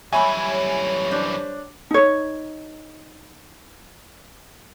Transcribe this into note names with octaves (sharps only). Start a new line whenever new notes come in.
F#2 E3 G3 C#5 E5 G#5 B5 C#6
D4 C5
D#4 C#5